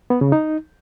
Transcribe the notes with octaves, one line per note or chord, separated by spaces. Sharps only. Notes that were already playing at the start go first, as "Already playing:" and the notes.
B3
C#3
D#4